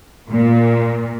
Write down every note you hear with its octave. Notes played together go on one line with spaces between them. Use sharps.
A#2